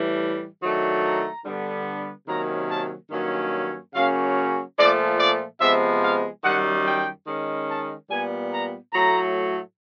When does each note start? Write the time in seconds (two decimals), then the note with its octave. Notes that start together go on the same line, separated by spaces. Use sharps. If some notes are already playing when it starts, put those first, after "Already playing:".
Already playing: A2 E3 G3
0.61 D#3 F#3 A3 D4
1.03 A#5
1.45 D3 G3 B3
2.27 C3 D#3 F#3 A#3 C#4 A#5
2.70 A5
3.11 G2 D#3 F#3 A#3 C#4
3.94 C#3 F#3 A#3 C#4 F5
4.77 A#2 F3 A3 D5
5.18 D5
5.60 C3 F3 G#3 B3 E5
6.02 F5
6.43 F#2 D#3 G3 F#5
6.85 G5
7.26 D#3 G#3 C#4
7.69 A5
8.09 A#2 G3 B3 G#5
8.51 A#5
8.93 A2 F#3 A3 A#5